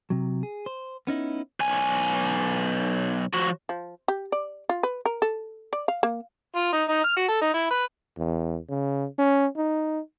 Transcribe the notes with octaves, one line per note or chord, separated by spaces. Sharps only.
C3 F#3
G#4
C5
B3 C#4 D#4 E4
B1 G#5
F3 F#4
F3
G4
D5
F4
B4
A#4
A4
D5
F5
A#3
F4
D#4
D#4
F6
F#4
A4
D#4
E4
B4
E2
C#3
C#4
D#4